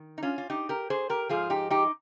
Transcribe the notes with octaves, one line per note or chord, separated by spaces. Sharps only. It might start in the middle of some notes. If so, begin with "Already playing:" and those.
Already playing: D#3
D#4
C#4 F4
F4
D#4 G4
G4 A#4
G#4 C5
G4 A#4
G#2 F3 F4 G#4
D#4 G4
D#4 G4